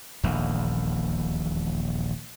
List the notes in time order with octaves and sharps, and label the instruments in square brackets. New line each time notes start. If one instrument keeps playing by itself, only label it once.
[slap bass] D#1 A#1 E2